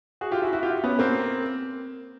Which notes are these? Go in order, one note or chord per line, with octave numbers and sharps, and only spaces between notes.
F#4 G#4
F4 G4
E4 F#4
E4 F#4
F4 G4
B3 C#4
A#3 C4